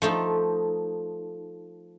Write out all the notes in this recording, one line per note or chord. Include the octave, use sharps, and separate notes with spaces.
F3 A3 D#4